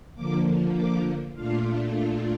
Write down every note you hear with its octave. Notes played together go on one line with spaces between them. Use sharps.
D3 F3 A#3 D6
D6
A#2 A3 D4 F4 F5
F5